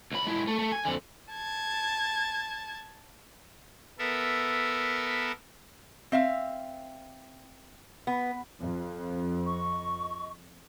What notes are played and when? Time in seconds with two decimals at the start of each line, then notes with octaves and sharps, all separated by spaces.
0.12 C#2 B5
0.27 G#3 E4
0.47 A3
0.59 A3
0.72 G#5
0.85 F2 D3
1.33 A5 G#6
3.99 B3 A4 A#4 E5
6.12 C4 E5 F5
8.07 B3
8.60 F2
9.46 D#5 C#6